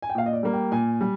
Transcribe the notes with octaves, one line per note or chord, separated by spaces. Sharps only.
G#5
G5
A#2 F5
D#5
D5
G3 A#3
G5
A#2 G#5
G3